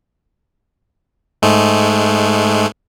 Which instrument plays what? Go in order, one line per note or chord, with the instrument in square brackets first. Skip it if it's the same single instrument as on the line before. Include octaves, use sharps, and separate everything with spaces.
[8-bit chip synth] G#2 G#3 A3